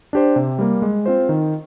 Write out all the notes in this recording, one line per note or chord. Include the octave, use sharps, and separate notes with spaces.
D4 G4 C5
C3
G3 A#3
G#3
C4 F4 C5
D#3